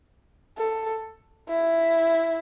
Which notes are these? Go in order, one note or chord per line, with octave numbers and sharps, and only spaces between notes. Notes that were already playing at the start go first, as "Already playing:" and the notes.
A4
E4